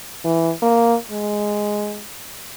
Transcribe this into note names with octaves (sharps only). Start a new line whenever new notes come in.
E3
A#3
G#3